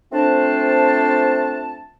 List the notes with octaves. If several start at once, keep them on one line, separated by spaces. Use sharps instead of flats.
A3 C4 D4 F4 C5 A5